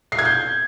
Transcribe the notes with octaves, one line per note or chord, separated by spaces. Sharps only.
C7
G#6
G6